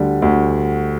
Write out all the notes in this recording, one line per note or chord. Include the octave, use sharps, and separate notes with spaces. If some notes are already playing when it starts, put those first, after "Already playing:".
Already playing: D2 D3 G3
D2